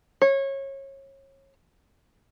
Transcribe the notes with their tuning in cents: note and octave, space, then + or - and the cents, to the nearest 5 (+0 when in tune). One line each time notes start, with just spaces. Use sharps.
C#5 -25